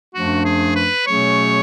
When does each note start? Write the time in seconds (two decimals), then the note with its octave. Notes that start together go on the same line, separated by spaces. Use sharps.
0.14 F#2 F3 A3 D4 F#4
0.45 G#4
0.75 B4
1.06 B2 F#3 A3 C#4 G#4 C#5